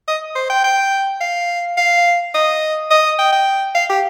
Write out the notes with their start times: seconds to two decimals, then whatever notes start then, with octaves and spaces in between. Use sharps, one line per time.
0.08 D#5
0.35 C5
0.50 G5
0.64 G5
1.21 F5
1.77 F5
2.34 D#5
2.90 D#5
3.19 G5
3.32 G5
3.75 F5
3.89 G4